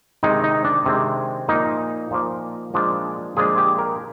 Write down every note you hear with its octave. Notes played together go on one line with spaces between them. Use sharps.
C3 D#3 G#3 C4 D#4
D#4
D4
C3 D#3 G#3 C4
A#2 F3 A#3 D#4
A#2 F3 A#3
A#2 F3 G#3 D4
A#2 F3 G#3 D4 G#4
G4
A#4